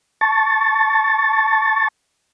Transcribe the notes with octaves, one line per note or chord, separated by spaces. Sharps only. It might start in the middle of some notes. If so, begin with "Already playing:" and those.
A5 C#6 A6